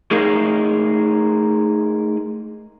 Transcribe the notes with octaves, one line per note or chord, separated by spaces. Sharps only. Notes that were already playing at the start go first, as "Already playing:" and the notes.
A3 D#4 G#4 A#4 D#5 F5